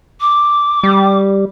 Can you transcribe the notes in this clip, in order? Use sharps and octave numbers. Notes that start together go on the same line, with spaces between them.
D6
G3